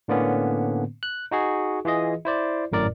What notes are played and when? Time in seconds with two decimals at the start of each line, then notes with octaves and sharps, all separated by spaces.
0.08 A2 D3 A#3 B3 C#4
1.03 F#6
1.31 D#4 F#4 G#4
1.85 E3 F4 G#4 D#5
2.25 E4 C5 D5
2.72 G#1 F#2 A2 A#4 D5